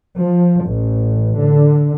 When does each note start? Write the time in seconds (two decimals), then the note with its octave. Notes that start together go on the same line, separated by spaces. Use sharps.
0.19 F3
0.65 A1
1.37 D3